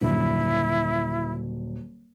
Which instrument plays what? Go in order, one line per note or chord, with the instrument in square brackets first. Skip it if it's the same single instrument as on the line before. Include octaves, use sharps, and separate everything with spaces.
[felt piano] D#1 F#2 D3 [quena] E4